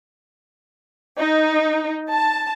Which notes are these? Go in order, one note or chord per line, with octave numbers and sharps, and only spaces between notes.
D#4
A5